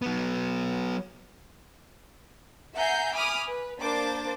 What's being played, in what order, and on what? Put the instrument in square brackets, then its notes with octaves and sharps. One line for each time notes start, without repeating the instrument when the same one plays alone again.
[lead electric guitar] F#3 B3
[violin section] E5 F#5 G#5 A#5 G6 C7
G#5 B5 D6 D#6 F6
B4
A#3 D4 C5 D6 A6